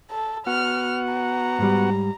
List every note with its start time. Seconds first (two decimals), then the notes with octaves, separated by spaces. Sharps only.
0.11 A4
0.47 B3 F#4 F#5 F6
1.13 A#5
1.59 G#2 G3